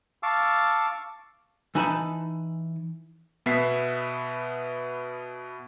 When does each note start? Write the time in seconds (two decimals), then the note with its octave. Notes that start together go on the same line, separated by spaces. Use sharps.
0.23 F5 A5 C#6 D6 E6
1.75 E3 D#4 G#5 A5 B5
3.46 B2 B3 E5 B6 C7